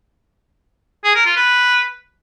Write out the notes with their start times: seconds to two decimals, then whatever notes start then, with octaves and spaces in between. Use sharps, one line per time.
1.04 G#4
1.15 A#4
1.26 F4
1.36 B4